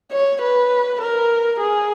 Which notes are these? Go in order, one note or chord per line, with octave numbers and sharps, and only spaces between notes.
C#5
B4
A#4
G#4